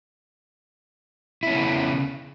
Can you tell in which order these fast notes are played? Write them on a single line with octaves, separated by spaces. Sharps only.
E4 C#4 B3 C#3